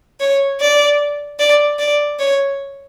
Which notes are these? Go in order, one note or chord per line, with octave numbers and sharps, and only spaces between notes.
C#5
D5
D5
D5
C#5